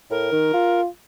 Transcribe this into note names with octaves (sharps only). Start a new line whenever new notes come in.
A2 A#4
D#3
F4